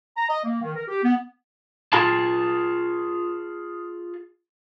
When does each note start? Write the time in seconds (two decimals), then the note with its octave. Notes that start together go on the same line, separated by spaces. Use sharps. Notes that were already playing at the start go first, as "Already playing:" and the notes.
0.16 A#5
0.29 D#5
0.44 A#3
0.61 D#3
0.75 A#4
0.88 G4
1.03 B3
1.93 F4 G#4 G#5 A5